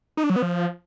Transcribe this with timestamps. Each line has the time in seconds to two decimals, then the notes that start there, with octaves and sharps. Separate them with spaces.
0.17 D#4
0.24 D4
0.30 F#3
0.36 B3
0.42 F3